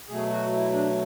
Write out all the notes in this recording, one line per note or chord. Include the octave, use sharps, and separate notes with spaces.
B2 F#3 A3 G#4
F#4
E4
D4